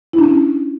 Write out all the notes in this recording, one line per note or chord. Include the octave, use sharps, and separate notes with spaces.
E4
D4
C#4